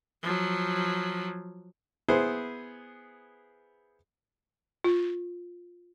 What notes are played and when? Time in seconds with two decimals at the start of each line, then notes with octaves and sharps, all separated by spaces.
0.23 F3 F#3
2.08 B3 E4 G#4 C5
4.84 F4